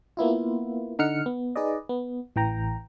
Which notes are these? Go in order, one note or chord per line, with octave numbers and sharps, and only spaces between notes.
A#3 B3 E4 F4
D3 D#4 F#5 F6 C#7
B3
D#4 G#4 B4 D5 D#5
B3
A1 E3 G5 A#5